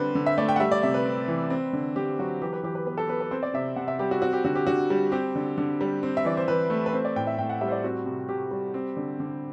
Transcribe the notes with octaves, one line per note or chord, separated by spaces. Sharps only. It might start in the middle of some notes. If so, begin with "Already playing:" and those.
Already playing: D3 G3 C4 B4 C5
D3
E5
A3 D5
G5
F#5
G3 E5
D5
C3 E5
B4
C4
E3
C4
D3
D3 G4
F#3 F#4
E3 G4
B4
E3 G4
B4
B3 B4
A4
B3 B4
B4
C4 C5
D5
C3 E5
C3 F#5
E5
G3 G4
F#4
C4 F#4
G4
D3 F#4
G4
D3 F#4
G3
C4 G4
D3
D3
G3
C4
E5
E3 D5
C5
E3 B4
A3
B4
C4 C5
D5
A2 G5
E5
A2 G5
F#5
G3 E5
C5
D5
C4 F#4
C3
C3 G4
G3
C4
D3
D3